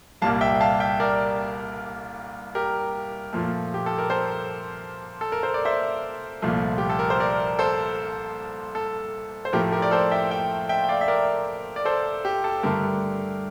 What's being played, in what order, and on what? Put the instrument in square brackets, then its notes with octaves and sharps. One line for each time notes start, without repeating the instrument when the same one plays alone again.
[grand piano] C2 A#2 G3 A#3 F5 A5
E5 G5
F5 A5
E5 G5
A#4 D5
G4 A#4
A#2 F3 A3
G4
A4
A#4
A4 C5
A4
A#4
C5
D5
C5 E5
C2 A#2 F3 A3
G4
A4
A#4
C5
A#4 D5
A4 C5
A4
C5
A2 F3 A3 G4 A#4
G4 A#4
D5
A4 C5
E5 G5
E5 G5
E5 G5
G5
D5 F5
E5
A#4 D5
D5
A4 C5
G4
A4
G2 D3 A3 G4 A#4